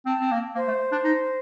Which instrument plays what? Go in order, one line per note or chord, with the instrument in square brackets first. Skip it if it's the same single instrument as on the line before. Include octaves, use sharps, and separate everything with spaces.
[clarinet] C4 [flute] A5
[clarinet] C4
A#3
[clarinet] A#3 [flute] C5
[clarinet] A3
D4
D#4